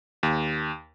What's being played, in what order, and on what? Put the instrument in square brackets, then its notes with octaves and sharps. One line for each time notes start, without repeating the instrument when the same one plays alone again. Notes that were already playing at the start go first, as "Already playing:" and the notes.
[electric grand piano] D#2